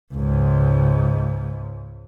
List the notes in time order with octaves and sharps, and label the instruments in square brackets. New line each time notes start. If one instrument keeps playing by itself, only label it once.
[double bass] C#2 G#2